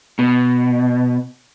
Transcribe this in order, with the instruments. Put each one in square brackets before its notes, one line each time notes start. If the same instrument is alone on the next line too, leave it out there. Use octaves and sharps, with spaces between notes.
[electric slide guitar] B2